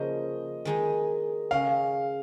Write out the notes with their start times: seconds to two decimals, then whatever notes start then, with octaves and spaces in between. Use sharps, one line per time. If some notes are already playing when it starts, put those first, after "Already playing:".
Already playing: C#3 F3 A#3 F4 D#5
0.65 D#3 G#3 D#4 G#4
1.51 C#3 G#3 C#4 F5